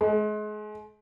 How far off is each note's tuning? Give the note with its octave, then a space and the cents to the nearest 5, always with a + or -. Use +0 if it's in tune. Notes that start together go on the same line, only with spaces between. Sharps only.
G#3 +35